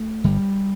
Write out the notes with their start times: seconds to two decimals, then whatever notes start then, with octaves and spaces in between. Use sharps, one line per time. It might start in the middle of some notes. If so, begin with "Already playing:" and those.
Already playing: A3
0.24 G1 G3